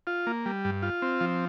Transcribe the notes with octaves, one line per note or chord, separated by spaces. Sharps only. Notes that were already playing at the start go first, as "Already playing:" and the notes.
F4
A#3
G3
G2
F4
C4
F3